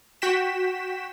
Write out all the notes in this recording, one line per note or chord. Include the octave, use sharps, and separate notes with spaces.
F#4 G5 B6 E7